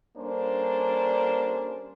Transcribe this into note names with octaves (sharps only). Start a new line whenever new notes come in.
G3 A#3 C#4 D4 A4 C5